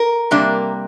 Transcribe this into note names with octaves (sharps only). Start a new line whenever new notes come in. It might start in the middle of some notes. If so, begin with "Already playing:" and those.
Already playing: A#4
C3 G3 A#3 D4